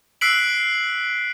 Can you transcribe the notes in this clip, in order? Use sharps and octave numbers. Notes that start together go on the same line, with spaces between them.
E6 F#6 B6 C7 D7 F#7